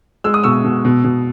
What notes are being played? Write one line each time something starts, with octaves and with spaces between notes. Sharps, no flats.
G#3 E6
D#6
B2 C#6 E6
B2
B2
B2